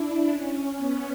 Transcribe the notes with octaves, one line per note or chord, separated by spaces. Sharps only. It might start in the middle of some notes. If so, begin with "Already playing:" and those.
Already playing: D4 E4
C#4
B3